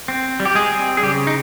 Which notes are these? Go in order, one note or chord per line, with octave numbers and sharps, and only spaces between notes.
C4
G3
G4
G#3 G#4
C4
G#4
C#3 G3 G4
D#4